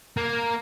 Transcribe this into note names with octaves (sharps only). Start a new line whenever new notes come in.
A#3